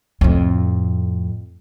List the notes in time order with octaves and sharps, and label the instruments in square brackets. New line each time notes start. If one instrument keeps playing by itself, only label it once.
[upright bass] F2 A2